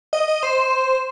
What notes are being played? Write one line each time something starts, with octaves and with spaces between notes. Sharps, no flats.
D#5
D#5
C5